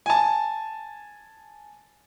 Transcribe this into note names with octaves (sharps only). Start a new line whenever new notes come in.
G#5 A5